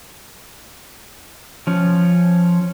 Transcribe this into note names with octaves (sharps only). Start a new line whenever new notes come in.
F3 C#4